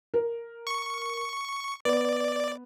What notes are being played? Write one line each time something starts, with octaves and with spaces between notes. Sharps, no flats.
A#4
C#6
B3 D5